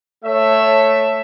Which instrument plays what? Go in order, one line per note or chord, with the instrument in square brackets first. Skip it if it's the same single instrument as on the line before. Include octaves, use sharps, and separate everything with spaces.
[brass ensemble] A3 C#5 E5